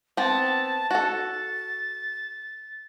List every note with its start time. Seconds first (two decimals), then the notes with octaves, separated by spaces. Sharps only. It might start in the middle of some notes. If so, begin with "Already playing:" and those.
0.17 B3 C4 A5
0.91 F#4 A4 A6